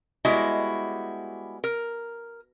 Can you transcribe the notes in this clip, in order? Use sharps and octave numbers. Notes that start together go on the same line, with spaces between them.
G3 G#3 B3 E4 F#4 D#5
A#4